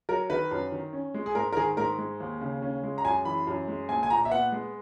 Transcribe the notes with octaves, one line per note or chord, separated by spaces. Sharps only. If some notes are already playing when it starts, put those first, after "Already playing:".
F#3 A#4
D#3 B4
F#2
D#3
C#4
G#3
G#4
G#2 A#4
A#4
D#3 G#4
G#2 A#4
G#3
D#2
C#3
C#4
G#3
A#5
F#2 G#5
E3 B5
F#2
G#3
A#1 G#5
G#5
A#2 A#5
E5
B3 F#5
G#3